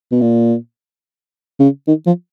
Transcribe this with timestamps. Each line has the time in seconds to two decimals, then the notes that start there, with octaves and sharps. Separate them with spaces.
0.11 B2
0.21 A#2
1.59 C#3
1.87 D#3
2.06 F3